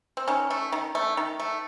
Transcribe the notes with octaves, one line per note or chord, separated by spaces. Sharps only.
C4
D#3 C#4
A3
D#3
A3
D#3
A3